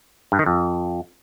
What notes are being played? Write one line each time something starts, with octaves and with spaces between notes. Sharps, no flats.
G2
D#3
F2